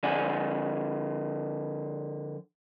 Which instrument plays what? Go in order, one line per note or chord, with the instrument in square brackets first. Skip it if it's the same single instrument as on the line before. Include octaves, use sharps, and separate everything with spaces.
[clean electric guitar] D3 F3 D5 F#5 G#5